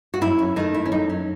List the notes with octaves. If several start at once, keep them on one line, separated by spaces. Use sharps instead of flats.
F#4
F#2 E4
C#4
D#3 A3 D#4
E4
C#4
F#2 D#4
C#4